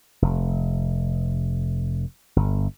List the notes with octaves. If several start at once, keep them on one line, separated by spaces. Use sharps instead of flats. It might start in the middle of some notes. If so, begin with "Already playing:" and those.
F1
G1